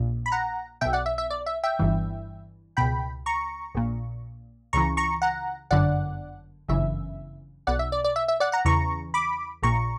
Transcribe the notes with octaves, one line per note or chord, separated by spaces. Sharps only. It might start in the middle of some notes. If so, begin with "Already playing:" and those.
Already playing: A#1 A#2
B5
F#5 A#5
B1 B2 E5 G5
D5 F#5
E5
E5
D5
E5
E5 G5
G1 G2 E3
C#2 B2 G5 B5
A#5 C#6
A#1 A#2
C#2 C#3 E3 A#5 C#6
A#5 C#6
F#5 A#5
G1 F#2 D3 D5 F#5
G1 F#2 C#3 E3 E5
B1 B2 D5 F#5
E5
D5
D5
E5
E5
D5 F#5
F#5 A#5
E2 C#3 E3 A#5 C#6
B5 D6
A#1 A#2 A#5 C#6